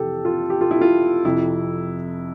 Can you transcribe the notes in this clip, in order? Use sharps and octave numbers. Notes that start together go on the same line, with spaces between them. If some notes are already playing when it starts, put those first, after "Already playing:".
Already playing: F2 C3 E3 G4 A4
F4
G4
F4
E4
F4
F2 C3 F3 E4